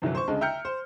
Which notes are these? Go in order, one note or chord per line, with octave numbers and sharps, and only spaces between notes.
G1 C2 E3 F#3
C5 C#6
D2 C#3 G#3 A5
E5 G5 A#5 F6 G6 C#7
C5